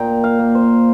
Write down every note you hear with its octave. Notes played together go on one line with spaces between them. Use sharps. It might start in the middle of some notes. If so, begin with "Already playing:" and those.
Already playing: A#2 G5 A#5
F5
A#3
C5